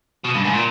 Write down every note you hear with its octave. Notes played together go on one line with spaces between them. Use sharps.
B2
G2
G#2
A#2